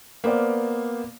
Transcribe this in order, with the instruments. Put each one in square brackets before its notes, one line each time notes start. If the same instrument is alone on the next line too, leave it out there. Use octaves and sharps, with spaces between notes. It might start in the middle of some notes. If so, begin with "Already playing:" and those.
[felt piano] A#3 B3 C5 D5 F5